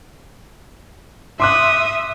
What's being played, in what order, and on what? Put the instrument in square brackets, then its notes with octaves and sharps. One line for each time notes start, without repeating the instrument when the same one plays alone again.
[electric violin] E5 D#6 [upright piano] C6 D6 F#6